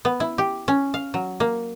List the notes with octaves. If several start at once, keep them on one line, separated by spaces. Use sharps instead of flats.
B3
E4
G4
C#4
F5
F#3
A#3